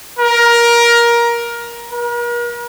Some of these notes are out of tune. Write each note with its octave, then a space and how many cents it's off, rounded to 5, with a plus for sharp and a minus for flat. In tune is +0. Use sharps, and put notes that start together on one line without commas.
A#4 +15
A#4 +45